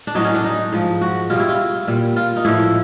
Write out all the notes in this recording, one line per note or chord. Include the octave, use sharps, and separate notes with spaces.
D4
A2 F#3 D#4
C#4
D4
D#4
G#2 F3
F#4
B2 G3 F4
E4
F4
A#2 G3
F4
D#4
A2 F3 E4